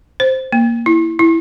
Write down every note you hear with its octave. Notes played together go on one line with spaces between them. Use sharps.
C5
A#3
E4
E4